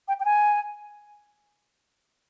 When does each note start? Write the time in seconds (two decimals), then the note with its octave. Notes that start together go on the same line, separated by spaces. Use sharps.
0.08 G5
0.20 G5
0.25 G#5